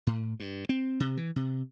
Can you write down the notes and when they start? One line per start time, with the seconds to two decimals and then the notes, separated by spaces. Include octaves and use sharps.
0.07 A2
0.40 G2
0.69 C4
1.00 C3
1.17 E3
1.36 C3